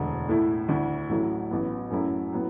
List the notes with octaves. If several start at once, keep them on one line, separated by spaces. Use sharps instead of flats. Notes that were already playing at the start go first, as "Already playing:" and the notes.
Already playing: E1 D2 D3
A2 A3 E4
D2 D3 A3 E4
A1 A2 F#3 A3 E4
A1 A2 F#3 B3
F#2 F#3 A3 E4
A2 F#3 B3